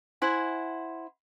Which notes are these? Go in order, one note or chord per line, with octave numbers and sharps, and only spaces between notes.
E4 C5 F#5 G#5